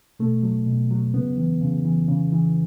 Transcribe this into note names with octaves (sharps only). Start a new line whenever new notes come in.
B2 A3
F#3
B2
F#3
C#3 B3
E3
C#3
E3
C#3
E3